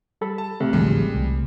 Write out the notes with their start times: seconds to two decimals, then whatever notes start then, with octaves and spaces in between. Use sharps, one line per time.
0.21 G3 A4 B5
0.38 A5
0.60 A1 C3 A3 C4
0.73 A1 D2 F3 G3 G#3
1.14 C2